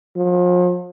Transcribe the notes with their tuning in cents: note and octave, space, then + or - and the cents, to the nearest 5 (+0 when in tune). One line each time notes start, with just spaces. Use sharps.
F3 +40